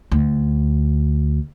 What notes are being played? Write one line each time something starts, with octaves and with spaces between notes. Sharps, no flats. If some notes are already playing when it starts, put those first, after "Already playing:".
D2